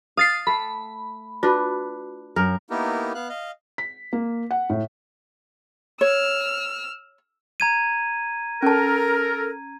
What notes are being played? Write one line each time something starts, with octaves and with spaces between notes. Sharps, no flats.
F5 D#6 A6 C7
A3 B5
D4 F4 F#4 B4
F#2 A#4
A#3 B3 D#4 E4 G4 A#4
B3 F5 F#6
D#5 F5
B6
A#3
F#5
A2
C#5 E6 F6
A#5 G#6 D#7
C#4 A4 A#4 A5